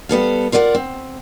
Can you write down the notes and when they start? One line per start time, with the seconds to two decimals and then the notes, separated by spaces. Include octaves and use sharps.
0.09 G3 B3 A4 F5
0.52 F4 A#4 D5 F5 F#5
0.75 C4